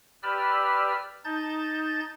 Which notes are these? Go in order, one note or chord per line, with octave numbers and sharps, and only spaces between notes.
G4 B4 D5 B5 E6 F6
D#4 A5 G6 A6